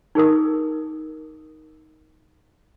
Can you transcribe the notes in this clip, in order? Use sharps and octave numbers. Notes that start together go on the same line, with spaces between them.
D#4 G#4 A#4 D#6